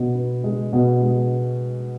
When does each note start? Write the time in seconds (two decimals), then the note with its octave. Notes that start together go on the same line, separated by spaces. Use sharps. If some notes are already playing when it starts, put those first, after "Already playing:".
Already playing: B2 B3
0.15 B3
0.44 G#3
0.73 B2
1.02 G#3